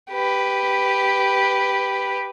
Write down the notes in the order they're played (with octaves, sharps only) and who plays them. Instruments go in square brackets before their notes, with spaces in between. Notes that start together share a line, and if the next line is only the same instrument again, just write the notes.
[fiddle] G4 B4